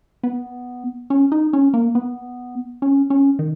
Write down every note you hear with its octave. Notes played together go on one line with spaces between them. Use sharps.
B3
C#4
D#4
C#4
A#3
B3
C#4
C#4
D#3